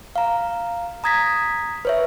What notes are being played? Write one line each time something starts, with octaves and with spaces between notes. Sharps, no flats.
F5 A#5
A#5 D#6 G#6 A#6 B6
B4 C#5 E5